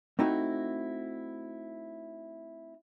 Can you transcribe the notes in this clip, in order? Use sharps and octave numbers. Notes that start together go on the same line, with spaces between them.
A3 C4 D#4 E4 F#4